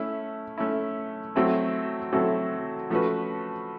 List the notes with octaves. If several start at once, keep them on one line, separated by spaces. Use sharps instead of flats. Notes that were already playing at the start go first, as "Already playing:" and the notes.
Already playing: A3 C#4 E4
A3 C#4 E4
F#3 A3 C4 E4 A4
F#3 A3 C4 E4 A4
F3 A3 C#4 F#4 B4